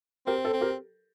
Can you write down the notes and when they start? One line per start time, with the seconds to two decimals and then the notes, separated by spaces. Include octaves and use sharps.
0.27 C4 G4 A#4
0.45 A4 C5
0.53 C4
0.61 G4 A#4